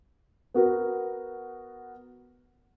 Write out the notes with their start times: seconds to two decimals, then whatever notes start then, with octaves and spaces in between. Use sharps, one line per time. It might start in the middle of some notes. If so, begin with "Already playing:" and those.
0.54 B3 F#4 A#4